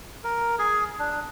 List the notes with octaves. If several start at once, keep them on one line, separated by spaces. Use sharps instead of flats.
A#4
G#4
D4